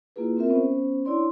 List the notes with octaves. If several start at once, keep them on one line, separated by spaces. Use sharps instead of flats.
A#3 E4 F4 G#4 B4
C4 F4 A#4 E5
B3 C#4 C5
D4 E4 C#5 D5 C6